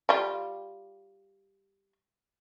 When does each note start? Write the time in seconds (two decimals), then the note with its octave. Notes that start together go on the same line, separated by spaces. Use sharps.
0.09 G3 F4